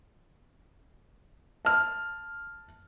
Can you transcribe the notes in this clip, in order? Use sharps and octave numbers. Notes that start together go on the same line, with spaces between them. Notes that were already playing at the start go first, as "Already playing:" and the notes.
A5 F6